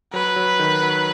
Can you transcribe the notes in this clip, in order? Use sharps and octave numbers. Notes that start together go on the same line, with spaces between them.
F#3 B4
F#3
D#3
F#3